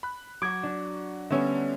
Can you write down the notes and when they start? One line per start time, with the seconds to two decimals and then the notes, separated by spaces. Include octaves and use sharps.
0.03 B5 F#6
0.42 F#3 F#4 D6 G#6
0.63 D4
1.30 D3 G3 B3 C#4 E5